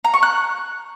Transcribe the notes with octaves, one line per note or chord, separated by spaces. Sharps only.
A#5
C#6
F#6